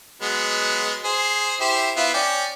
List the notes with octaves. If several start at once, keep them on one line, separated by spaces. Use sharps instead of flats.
F#3 G#3 B3
G#4 C5
E4 G4 C5
B3 E4 F4
C#4 D5 G5